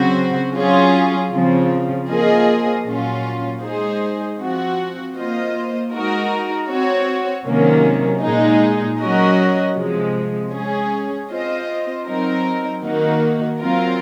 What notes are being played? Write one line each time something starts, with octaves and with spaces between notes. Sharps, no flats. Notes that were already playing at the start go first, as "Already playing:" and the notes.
Already playing: C#3 F#3 C4 F#4 C5
F#3 C#4 F4 G#4
C#3 F3 C4
F3 A#3 F4 G#4 D#5
A#2 F#3 C#4 F4
G#3 D#4 G#4 C5
F3 C4 F#4
A#3 F4 C5 D#5
G#3 D#4 F#4 A#4
C4 F#4 C#5
C3 D#3 F#3 A#3 C#4
A#2 G#3 D#4 G#4
F#3 C#4 F#4 A#4 D#5
C3 F3 G#3
G#3 C#4 G#4
C4 F4 C5 D#5
F#3 C4 D#4 A#4
D#3 A#3 D#4 F#4
F#3 C4 F4 A#4